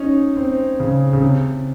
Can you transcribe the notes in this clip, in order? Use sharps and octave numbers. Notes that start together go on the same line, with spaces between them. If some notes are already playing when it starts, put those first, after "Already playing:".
Already playing: C#4 D#4
C4
C#3
C#3
C3